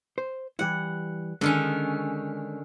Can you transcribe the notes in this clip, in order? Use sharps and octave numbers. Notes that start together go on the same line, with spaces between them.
C5
E3 G3 E4 F#5
D3 D#3 G#3 C#4 D4